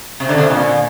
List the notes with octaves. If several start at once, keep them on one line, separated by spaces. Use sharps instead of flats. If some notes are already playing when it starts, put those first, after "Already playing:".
C3
D3
C3
A#2